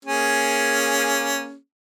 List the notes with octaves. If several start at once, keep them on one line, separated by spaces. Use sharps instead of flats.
A#3 C#4 G#4